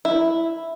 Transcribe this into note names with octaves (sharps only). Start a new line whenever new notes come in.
E4